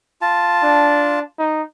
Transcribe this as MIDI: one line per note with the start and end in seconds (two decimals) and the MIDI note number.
0.21 1.19 65
0.21 1.19 81
0.63 1.23 62
1.39 1.63 63